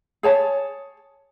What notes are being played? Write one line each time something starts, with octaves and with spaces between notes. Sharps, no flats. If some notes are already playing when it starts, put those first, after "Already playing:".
G#4 C#5 A5